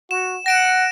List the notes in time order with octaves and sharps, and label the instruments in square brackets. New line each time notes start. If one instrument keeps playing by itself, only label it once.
[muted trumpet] F#4 [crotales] E7
[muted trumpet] F#5 [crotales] A#6 D7 E7